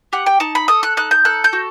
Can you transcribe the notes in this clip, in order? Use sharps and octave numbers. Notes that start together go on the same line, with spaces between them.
G4 F#5
G5
D#4 A5
B5
A4 D#6
F#6
D#4 F#6
G6
A4 F#6
G6
F#4